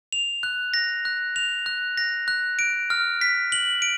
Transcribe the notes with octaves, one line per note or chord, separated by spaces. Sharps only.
F7
F#6
A#6
F#6
F7
F#6
A#6
F#6
D7
F6
B6
F#7
D7